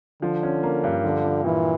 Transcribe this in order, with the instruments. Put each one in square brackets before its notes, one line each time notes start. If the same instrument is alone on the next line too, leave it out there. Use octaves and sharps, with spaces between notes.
[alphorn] D3 [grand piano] F3
[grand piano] C#4
A#3
G2
[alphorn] D3 [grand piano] F3
[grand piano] F3
[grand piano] A#2 [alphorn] E3